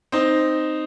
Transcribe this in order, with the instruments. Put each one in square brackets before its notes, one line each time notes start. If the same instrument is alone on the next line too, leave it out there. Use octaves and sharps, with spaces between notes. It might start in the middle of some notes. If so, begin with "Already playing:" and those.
[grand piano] C4 D#4